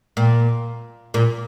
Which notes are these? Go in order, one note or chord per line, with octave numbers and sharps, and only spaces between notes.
A#2
A#2